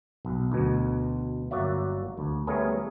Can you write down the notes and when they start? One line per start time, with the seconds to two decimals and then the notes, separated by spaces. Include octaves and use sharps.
0.25 B1
0.52 D2 B2
1.51 G1 F#3 A#3 F#4 D5 E5
2.17 D2
2.47 G3 A3 B3 C#4 G#4 A#4